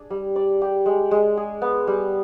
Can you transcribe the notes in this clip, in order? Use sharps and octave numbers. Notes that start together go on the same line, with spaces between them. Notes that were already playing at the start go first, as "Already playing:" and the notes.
Already playing: D4 G#4
G3
D5
G4
G#3
G#3
G#4
B3
G3